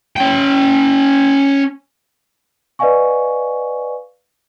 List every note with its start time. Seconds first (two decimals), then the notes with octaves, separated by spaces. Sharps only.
0.17 C#4 G5
2.79 B4 D5 D#5 F5 G#5 C#6